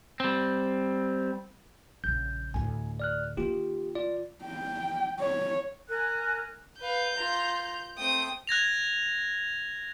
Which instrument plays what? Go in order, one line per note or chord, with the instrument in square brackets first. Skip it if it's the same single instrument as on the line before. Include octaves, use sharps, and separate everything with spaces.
[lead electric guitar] G3 C4
[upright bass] A#1 C#3 [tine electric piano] G6
[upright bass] D2 A2 [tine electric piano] G#5
[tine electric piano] D5 F6 F#6
[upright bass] D#3 A#3 [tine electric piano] F4 G4
[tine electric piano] F4 D5
[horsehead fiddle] G5
C#5
[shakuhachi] A#4 [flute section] G#5 F#6
[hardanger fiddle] B4 F5 [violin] G6
[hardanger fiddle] F4 A#5
[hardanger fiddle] A3 C4 [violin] G5 D#6
[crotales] F#6 G#6 A#6 F7